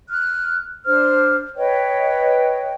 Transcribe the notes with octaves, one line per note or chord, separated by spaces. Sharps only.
F6 F#6
D4 C5 F6
B4 C#5 D#5 G5